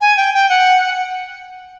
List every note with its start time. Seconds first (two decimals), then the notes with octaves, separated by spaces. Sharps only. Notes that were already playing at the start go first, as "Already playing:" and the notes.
0.01 G#5
0.17 G5
0.34 G5
0.50 F#5